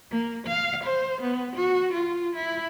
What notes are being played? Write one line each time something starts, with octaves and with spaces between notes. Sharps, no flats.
A#3
F5
C5
B3
F#4
F4
E4